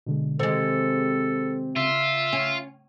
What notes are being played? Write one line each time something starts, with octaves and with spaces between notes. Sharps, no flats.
B2 D3 G#3
C3 D#3 G#3 A4 C5
C#3 F4 E5
C#4